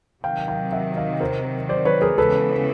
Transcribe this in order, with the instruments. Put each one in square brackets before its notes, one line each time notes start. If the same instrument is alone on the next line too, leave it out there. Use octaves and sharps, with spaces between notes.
[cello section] C3 D#3 F#3 [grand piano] F5 G5
[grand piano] F5 G5
E5 F#5
D#5 F5
A#4 C5
C5 D5
B4 C#5
G#4 A#4
[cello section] C#3 E3 G#3 B3 E4 [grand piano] A4 B4